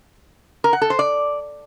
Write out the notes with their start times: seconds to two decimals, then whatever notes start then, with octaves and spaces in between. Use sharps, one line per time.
0.64 A#4
0.73 F#5
0.82 A4
0.90 C5
0.99 D5